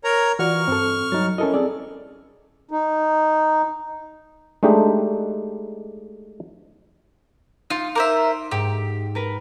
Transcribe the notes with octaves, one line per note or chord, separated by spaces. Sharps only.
A#4 C#5 A#5
E3 F4 F#4 D5 C#6 F6
G2 C4 A4
F#3 G3 D#4 A6
C#4 E4 A4 A#4 D#5
C4 G#4 A4 D5
D#4
G#3 A3 D4 D#4 G4
D#4 F4
A#4 C5 E5 D6
G#2 G4
A#4 B4